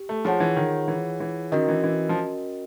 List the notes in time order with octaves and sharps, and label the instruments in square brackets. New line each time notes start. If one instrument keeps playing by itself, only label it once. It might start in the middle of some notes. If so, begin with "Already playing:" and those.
Already playing: [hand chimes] G4
[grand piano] A3
[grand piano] F3 [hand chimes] F4 G#4 C#5 F#5
[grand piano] E3
D#3
E3
E3
[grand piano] D#3 [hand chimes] C#4 F#4 A#4 D#5
[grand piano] E3
E3
F3